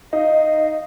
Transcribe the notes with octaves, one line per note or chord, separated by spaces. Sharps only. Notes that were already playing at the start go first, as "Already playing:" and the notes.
D#4 D#5 F5